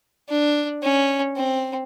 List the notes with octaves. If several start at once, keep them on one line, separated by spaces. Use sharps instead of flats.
D4
C#4
C4